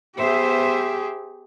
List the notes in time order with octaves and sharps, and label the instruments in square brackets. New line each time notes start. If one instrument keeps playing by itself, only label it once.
[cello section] B3 C5 E5 [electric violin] G4 G#4